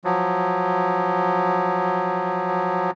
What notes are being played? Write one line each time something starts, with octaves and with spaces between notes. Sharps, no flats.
F3 F#3